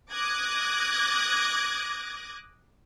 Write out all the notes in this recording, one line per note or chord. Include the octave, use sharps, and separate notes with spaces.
D6 D#6 F#6 G#6 A#6